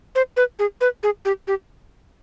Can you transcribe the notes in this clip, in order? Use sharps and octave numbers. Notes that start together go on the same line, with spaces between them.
C5
B4
G#4
B4
G#4
G4
G4